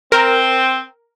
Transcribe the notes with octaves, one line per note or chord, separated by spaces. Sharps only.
C4 A#4